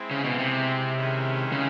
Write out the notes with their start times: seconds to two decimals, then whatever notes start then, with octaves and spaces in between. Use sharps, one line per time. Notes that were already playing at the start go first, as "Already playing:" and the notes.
Already playing: G#3 C4 E4
0.11 C#3
0.24 B2
0.39 C3
0.96 D#3 G#3 C#4 E4
1.52 C#3